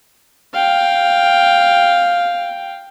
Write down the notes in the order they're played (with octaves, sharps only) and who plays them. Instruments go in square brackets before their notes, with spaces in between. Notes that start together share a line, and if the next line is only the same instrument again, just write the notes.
[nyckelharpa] F5 G5